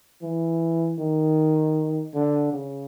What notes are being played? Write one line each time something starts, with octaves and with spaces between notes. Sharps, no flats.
E3
D#3
D3
C#3